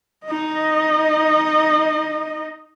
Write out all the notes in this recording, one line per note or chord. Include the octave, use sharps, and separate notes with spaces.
D#4 D#5